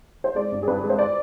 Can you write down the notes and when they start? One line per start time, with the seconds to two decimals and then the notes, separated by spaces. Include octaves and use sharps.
0.24 C5
0.35 G#3 D5
0.52 G2
0.63 G#4
0.68 G2 B4
0.83 G#3
0.90 C5
0.99 D5